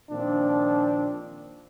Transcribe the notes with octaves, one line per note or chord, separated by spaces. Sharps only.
A#2 D#3 F3 C4 D4